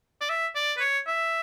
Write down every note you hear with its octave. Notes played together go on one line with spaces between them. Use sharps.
D5
E5
D5
B4
C#5
E5